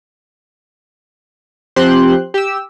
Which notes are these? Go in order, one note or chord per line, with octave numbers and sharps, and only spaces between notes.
F3 C4 G4 C5 C6 F#6
G4 E6